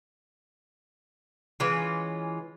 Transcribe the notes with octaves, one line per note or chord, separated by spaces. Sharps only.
E3 G#3 C#4 F4